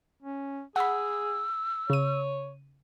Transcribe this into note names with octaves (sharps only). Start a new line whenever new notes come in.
C#4
G#4 F#5 B5 E6
C#3 C#5 D#7